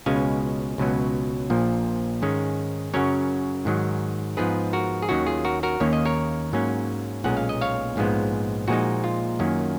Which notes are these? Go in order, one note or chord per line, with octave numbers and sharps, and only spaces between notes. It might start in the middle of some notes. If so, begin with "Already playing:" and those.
C#2 B2 G#3 C#4 F5 G#5
C#2 B2 F#3 C#4
A#1 A#2 F3 A#3
G#2 D#3 G#3 C#4
F#2 C#3 F#3 C#4 A#4 C#5
G#2 D#3 F#3
G#2 F3 B3 D#4 G#4 B4
F#4 A#4
G#4
D#2 D#3 F#3 C#4 F#4
F4 G#4
F#4 A#4
F#4 A#4
D#2 D#3 A#3 C#4 C#5
D#5
A#4 C#5
G#2 F#3 A#3 C#4
B1 A#2 G#3 C#4 F#5
F5
D#5
C#5 F5
A#1 G#2 F3 G#3 B3
A#2 F3 G#3 D#4 F#4
F4
F#2 D#3 A#3 C#4